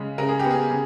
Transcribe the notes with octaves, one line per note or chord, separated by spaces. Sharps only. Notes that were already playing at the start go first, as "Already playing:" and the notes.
Already playing: C#3 G#3
C#3 A#4
G#4
G4
B3
G#4
C#3